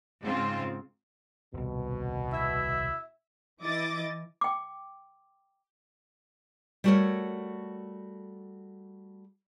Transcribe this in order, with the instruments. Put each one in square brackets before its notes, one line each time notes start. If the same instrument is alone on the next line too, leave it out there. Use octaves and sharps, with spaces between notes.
[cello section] G#2 C#3 C4 F4
[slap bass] D#1 C2 [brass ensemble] B2
[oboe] E4 [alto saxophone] E5
[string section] E3 E4 D#5 D6 A6
[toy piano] G5 D6
[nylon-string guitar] G3 A3 F#4 A4 A#4 C#5